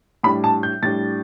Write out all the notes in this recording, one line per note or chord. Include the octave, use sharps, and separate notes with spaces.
A2 G3 D4 B5
A5
G6
A2 G3 D4 A6